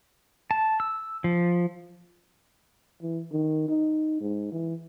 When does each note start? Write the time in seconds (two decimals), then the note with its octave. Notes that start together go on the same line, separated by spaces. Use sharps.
0.51 A5
0.80 E6
1.24 F3
3.02 E3
3.32 D#3
3.69 D#4
4.21 G#2
4.52 E3